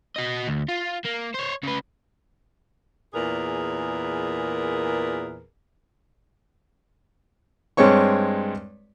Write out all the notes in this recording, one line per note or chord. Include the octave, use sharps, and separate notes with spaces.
F#4 D#5
D2
F4
A#3
C5 C#5
C#3 B4
E2 A#2 G#4 A#4 B4
G2 G#3 C4 C#5 C#6